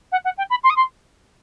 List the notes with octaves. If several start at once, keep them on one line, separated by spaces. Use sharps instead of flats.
F#5
F#5
G5
B5
C6
D#6
C6